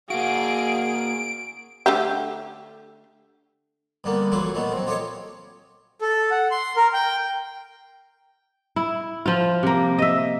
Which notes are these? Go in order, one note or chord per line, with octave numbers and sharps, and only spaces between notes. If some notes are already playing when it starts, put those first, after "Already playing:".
A#3 F#4 G#4 F5 D7
D3 A3 G4
G2 D3 A#3 B3
E3 F#3 A3 D4 E4 F4
A#2 D#3 A3 B3
F#3 C4
F4 G4 A4 C#5 D#5
A4
F#5
C6
A#4
G5
E4
F3 F4
C3 A#3
D#5 E5